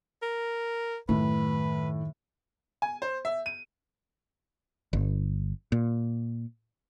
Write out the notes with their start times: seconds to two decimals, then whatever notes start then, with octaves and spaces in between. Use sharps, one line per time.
0.22 A#4
1.09 F#2 A2 D#3 B4
2.82 G#5
3.02 C5
3.25 E5
3.46 D#7
4.93 G1
5.72 A#2